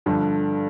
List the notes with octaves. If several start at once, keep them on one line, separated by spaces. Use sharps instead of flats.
G2 D3 F3